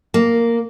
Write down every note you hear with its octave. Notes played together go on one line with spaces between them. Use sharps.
A#3